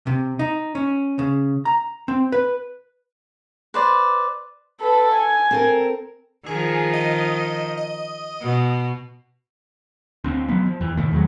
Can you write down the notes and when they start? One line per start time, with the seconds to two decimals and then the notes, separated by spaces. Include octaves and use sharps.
0.07 C3
0.39 D#4
0.75 C#4
1.19 C#3
1.65 A#5
2.08 C4
2.32 B4
3.74 B4 C5 D5
4.81 A4 B4
5.14 G#5
5.51 C4 A4 A#4
6.46 D#3 F3 G#4
6.93 D#5
7.77 D#5
8.41 B2
10.24 D2 C4
10.48 F3 F#3 B3
10.66 F3
10.81 F2 E3
10.97 A2 C3 D#3 A3
11.11 E2 D#3 F#3 G#3